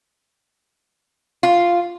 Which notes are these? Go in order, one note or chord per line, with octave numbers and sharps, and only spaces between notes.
F4